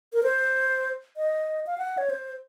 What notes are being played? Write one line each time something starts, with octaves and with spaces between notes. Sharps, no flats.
A#4
C5
D#5
F5
F#5
C#5
C5